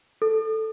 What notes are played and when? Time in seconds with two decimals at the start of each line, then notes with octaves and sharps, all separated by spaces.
0.22 A4